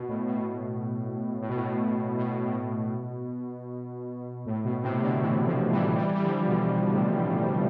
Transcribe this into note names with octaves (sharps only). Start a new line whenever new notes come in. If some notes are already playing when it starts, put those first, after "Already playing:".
Already playing: B2
A2
B2
B2
A2
B2
A2
B2
A2
B2
A2
B2
A2 C3
B2 D3
C3 E3
D3 F3
E3 G3
E3 G3
G3
D3 F3
B2 D3
B2
A2 C3
B2
A2